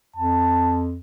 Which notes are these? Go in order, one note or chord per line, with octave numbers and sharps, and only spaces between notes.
F2 A5